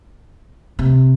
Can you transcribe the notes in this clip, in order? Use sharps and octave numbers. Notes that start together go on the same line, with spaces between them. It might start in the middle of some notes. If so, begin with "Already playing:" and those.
C3